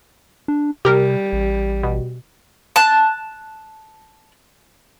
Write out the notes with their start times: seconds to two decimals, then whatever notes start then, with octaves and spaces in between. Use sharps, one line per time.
0.48 D4
0.85 C3 G3 G4 A#4
1.33 A1
1.83 B2
2.76 A5 F#6